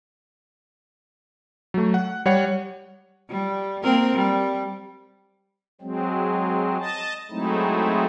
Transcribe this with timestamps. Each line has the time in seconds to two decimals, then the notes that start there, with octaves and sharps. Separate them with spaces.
1.74 F#3 A3
1.94 F#5
2.26 G3 C#5 F#5 C#7
3.30 G3
3.83 A#3 C4 A#4
4.15 G3
5.81 F#3 G#3 C4
6.79 D#5 A5
7.30 F#3 G#3 A3 C4 D#4 E4